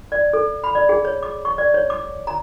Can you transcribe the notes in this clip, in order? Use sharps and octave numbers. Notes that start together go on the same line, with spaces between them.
D5
A4
B5
D5
G#4
C#5
D6
C#6
D5
C#5
D6
A#5